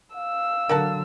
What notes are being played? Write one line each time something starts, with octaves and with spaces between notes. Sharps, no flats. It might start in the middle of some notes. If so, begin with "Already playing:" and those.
F5 E6
D3 F#3 A#4 F#5 A5